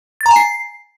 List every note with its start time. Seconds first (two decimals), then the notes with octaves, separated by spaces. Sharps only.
0.21 A6
0.26 A#5
0.31 G#5
0.36 C7